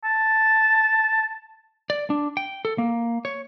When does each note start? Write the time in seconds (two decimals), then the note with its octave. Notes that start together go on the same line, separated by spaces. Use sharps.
0.04 A5
1.90 D5
2.10 D4
2.37 G5
2.65 A4
2.78 A#3
3.25 C#5